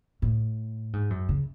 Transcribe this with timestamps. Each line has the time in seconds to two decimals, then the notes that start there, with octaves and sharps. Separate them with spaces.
0.22 A2
0.93 G#2
1.10 F#2
1.29 C#3